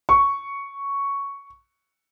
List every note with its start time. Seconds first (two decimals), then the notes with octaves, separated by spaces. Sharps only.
0.09 C#6